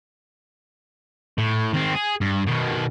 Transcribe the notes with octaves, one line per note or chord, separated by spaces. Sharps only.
A2
D#3 C4
G#4
G2
B2 D#3